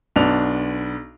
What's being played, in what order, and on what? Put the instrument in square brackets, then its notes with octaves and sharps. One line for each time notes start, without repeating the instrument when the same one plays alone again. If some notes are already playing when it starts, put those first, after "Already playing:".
[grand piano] B1 B3 D4 F7